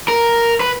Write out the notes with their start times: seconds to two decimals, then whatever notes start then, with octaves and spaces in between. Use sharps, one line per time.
0.08 A#4
0.60 B4